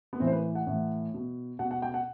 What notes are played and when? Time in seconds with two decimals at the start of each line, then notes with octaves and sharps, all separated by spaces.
0.13 B3
0.20 A2 E3 C4
0.27 C5
0.33 B4
0.55 F#5
0.67 A2 E3
1.14 B2
1.59 B2 F#5
1.71 F#5
1.82 G5
1.94 F#5